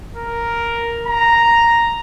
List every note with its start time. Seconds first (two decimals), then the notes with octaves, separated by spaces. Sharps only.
0.16 A#4
1.07 A#5